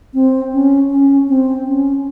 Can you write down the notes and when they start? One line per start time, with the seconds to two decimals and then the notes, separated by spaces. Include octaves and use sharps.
0.14 C4
0.53 C#4
0.90 C#4
1.28 C4
1.66 C#4